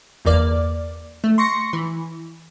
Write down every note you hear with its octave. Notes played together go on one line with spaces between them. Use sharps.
G1 E2 A#3 D5
A3
C6 C#6 A#6 C#7
E3